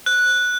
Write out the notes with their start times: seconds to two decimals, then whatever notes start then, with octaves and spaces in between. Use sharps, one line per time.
0.06 F#6